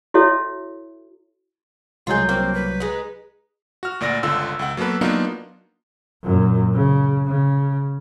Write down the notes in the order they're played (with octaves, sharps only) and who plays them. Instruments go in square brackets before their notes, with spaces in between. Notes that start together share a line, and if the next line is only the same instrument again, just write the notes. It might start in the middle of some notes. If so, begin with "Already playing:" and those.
[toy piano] E4 F#4 A4 C#5 E5
[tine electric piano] C2 F#3 G6 [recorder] G#3 [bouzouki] F4 G#4
[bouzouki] A#3 [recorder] C4
[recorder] B4
[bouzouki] G#3 D#4
[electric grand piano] F#4 F6
D2 A#2 D5 F6 A#6
G1 C#2 D3 F4 E6
C#2 F#5
F#3 A#3 B3 A4 B4
F#3 A#3 B3 D4 D#4 F4
[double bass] F#2 A#2
C#3
C#3